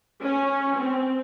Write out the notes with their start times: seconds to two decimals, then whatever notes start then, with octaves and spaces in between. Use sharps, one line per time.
0.22 C#4
0.76 C4